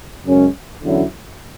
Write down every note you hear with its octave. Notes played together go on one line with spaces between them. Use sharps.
F#2 C#3 G#3 C#4
E2 D3 F#3 C#4 E4